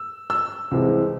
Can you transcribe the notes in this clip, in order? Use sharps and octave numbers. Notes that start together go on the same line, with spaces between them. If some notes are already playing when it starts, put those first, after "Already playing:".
Already playing: E6
E6
C2 C3 E3 G#3 C4